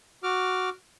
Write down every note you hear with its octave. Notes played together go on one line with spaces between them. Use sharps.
F#4 D6 F6